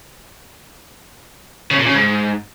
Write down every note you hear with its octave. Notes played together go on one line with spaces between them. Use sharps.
C#3
A#2
C#3
G#2